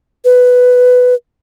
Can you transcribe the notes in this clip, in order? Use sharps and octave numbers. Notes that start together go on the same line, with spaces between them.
B4